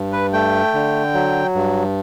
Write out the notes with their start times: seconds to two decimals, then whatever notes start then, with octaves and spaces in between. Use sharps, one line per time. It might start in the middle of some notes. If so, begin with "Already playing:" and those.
Already playing: G2
0.12 B4
0.33 A3 G5
0.74 D3
1.14 F#3
1.55 G2